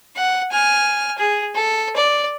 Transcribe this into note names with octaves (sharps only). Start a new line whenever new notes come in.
F#5
G#5 F6
G#4
A4
D5